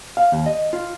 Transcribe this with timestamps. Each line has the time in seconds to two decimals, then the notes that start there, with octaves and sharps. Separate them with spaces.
0.17 F5
0.32 D#2
0.46 D#5
0.73 F4